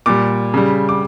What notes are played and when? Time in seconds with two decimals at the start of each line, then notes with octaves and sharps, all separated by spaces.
0.06 A#2 G3 D6
0.54 C#3 G3
0.89 D6